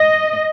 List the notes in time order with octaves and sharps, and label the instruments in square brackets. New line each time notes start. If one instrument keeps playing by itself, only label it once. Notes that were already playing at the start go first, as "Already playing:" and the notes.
Already playing: [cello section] D#5